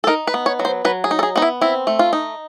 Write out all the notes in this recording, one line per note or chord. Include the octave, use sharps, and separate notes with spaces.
A4
D#4 A#4
B4
B3
C#5
F#3
C5
F#3 B4
G#4
D#4
A4
G#4
B3 D#4
E4
C4 E4
A3
F4
D#4